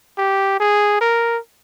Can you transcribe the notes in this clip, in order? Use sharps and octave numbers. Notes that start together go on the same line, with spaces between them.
G4
G#4
A#4